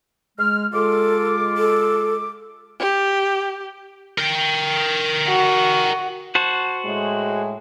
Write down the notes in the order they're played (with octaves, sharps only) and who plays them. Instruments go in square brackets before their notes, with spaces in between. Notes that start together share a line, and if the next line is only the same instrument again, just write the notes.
[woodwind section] G#3 F6
[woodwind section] G#3 F4 D6 [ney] A4
[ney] A4
[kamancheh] G4
[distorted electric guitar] A#4 G5
[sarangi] F#4
[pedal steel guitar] F#4 C5 A5
[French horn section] A2 G#3